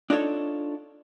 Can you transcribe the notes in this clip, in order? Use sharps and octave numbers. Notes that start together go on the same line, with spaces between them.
D4 D#4 F4 A4 C#5